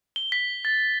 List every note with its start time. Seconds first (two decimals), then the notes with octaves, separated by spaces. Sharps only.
0.16 G7
0.32 B6
0.65 A6